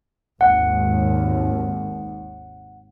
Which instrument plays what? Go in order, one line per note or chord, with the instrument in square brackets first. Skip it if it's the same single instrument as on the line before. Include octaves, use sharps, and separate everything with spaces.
[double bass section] G#1 D#2 [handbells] F#5